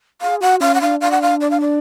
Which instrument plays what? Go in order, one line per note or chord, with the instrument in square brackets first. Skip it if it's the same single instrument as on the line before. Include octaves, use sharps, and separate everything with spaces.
[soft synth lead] G#4 [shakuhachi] F5
[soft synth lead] F#4 [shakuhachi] F#5
[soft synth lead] C#4 [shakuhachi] F5
[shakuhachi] F#5
[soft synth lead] D4 [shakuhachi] F5
[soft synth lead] D4 [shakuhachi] F5
[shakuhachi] F#5
F5
D5
F5
D5